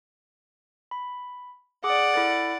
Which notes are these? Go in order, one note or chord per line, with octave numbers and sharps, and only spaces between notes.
B5
G#4 D5 F#5 D6
E4 A4 A6